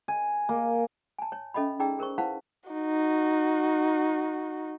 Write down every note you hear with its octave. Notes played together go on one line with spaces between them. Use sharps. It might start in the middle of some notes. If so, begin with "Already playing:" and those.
G#5
A#3
G#5 A5
C#5
C#4 A4 D#5 E5 B5
D#4 G#4 D5 G5 A#5 E6
G#4 A#4 C5 C#6
E4 B4 C5 F5 F#5 A5
D#4 F#4